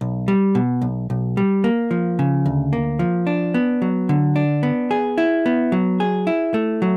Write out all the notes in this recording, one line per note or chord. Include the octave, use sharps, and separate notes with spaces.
B1
G3
B2
B1
B1
G3
A#3
F3
C#3
D2
A#3
F3
D4
B3
F#3
D3
D4
B3
G#4
E4
B3
F#3
G#4
E4
A3
F#3